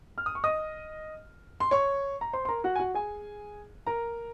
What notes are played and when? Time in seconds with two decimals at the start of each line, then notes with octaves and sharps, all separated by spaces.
0.18 F6
0.26 D#6
0.35 C#6
0.44 D#5 D#6
1.60 C6
1.71 C#5 C#6
2.21 A#5
2.33 C5 C6
2.45 C6
2.48 A#4 A#5
2.64 F#4 F#5
2.76 G#5
2.79 F#4 F#5
2.94 G#4 G#5
3.87 A#4 A#5